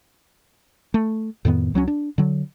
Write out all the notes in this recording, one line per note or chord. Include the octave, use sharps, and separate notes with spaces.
A3
F2 A2 D#3 B3
C#2 F#3 C4 C#4
D4
D3 F#3